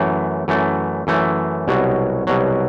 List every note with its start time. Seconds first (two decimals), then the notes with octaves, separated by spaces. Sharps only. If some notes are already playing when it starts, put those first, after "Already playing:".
Already playing: F#2 E3 A3
0.48 F#2 E3 A3
1.07 F#2 E3 A3
1.68 C2 B2 F#3
2.27 C2 B2 F#3